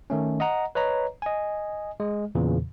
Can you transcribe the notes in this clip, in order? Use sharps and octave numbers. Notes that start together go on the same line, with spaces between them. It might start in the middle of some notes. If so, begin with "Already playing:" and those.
D#3 A3 C#4
D#5 F#5 A#5
B4 C#5 D#5 A#5
D#5 G#5
G#3
E2 A#2 C#3 E3